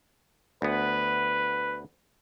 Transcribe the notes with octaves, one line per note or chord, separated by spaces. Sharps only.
D2 B3 B4